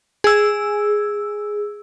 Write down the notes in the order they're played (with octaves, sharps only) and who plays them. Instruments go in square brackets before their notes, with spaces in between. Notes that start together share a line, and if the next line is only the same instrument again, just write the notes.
[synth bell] G#4 E6